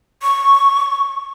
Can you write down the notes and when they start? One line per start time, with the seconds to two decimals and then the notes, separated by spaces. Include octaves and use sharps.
0.22 C#6